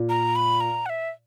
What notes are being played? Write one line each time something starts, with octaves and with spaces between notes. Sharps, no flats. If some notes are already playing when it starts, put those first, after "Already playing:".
Already playing: A#2
A#5
B5
A#5
F#5
E5